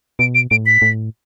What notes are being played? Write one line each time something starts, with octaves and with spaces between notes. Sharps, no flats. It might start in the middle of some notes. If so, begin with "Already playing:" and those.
B2 D7
D7
A2 D7
B6
A2